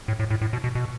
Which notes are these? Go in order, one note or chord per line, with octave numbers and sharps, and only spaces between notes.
A2
A2
A2
A2
B2
B2
B2